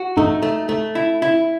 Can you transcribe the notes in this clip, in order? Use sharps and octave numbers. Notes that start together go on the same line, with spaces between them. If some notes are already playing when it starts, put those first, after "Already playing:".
Already playing: F#4
A3 D#4
A3
A3
E4
E4